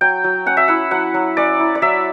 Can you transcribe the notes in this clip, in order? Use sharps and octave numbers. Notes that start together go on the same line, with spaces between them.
F#3 G5
F#3
C#4 F#5
E5
E4 F#5
F#3 F#5
F#3
C#4 D5
E4
D5
F#3 E5